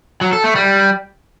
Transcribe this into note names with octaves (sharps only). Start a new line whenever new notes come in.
F#3
A4
A3
G3